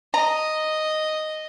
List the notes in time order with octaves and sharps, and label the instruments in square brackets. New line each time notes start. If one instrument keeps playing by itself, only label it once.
[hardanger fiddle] D#5 [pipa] A#5